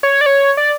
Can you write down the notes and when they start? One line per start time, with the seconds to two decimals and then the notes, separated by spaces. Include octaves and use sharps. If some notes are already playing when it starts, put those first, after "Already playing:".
0.03 C#5
0.21 D5
0.26 C#5
0.57 D5